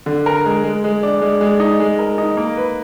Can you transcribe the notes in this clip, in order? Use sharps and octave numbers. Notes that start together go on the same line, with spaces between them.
D3
A#4
G#3
G#3
G#3
D4
G#3
G#3
D#4
G#3
A#4
D#4
A#3
B4